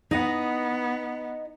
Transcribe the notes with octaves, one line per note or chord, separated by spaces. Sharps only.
B3 D#4 D#5 F#5